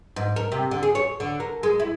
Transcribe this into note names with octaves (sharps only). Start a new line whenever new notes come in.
G#2
A#4
C3
D3
G#4
C#5
D3
A#4
G#3
E4